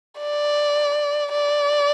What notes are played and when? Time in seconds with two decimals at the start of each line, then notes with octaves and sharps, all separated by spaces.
0.18 D5
1.32 D5